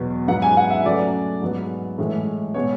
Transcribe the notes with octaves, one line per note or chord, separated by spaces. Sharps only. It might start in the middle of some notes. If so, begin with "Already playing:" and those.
Already playing: E2 B2 F#3 B3
G#2 F#3 B3 F#5
G#5
F#5
E5
C#3 F#3 A3 D5
G#2 F#3 B3
A2 E3 G#3
B2 G#3 B3 C#5